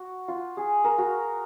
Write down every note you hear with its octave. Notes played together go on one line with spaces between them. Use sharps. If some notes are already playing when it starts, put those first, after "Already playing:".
Already playing: F#4
F4
G#4
A#4
F#4